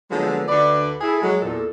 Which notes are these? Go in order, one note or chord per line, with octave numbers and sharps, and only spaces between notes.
D3 F3 F#3 G#3 A#3 B3
D2 D3 B4 D5
E4 G#4 A4
F#3 G#3
E2 A#2 A4